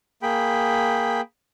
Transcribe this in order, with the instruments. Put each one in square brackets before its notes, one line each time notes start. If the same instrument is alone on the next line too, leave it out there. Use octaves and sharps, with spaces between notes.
[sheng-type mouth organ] A#3 G#4 G5 B5